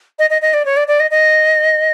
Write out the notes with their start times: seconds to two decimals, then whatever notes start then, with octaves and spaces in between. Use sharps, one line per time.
0.19 D#5
0.30 D#5
0.42 D#5
0.54 D5
0.65 C#5
0.77 D5
0.88 D5
1.00 D#5
1.11 D#5